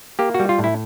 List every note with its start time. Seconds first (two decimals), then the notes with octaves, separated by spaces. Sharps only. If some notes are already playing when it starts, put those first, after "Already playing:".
0.19 A#3 G4
0.34 G3 F#4
0.49 F4
0.59 A2
0.64 E4